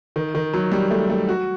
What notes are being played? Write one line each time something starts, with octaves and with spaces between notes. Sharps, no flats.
D#3
D#3
F#3
G3
A3
A3
F#4